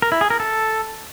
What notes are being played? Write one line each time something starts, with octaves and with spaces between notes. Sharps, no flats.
A#4
E4
G#4
A#4
A4